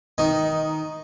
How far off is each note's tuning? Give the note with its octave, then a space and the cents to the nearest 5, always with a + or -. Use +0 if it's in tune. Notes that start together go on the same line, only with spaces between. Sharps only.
D#3 +10 D#4 +0